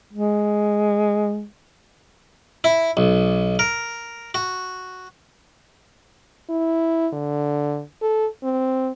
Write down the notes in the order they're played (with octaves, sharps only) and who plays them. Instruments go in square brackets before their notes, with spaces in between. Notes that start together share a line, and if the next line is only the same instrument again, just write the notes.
[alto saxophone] G#3
[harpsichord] E4
B1
A#4
F#4
[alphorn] E4
D3
A4
C4